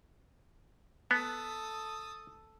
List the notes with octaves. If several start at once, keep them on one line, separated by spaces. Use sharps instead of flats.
B3 A4 D#6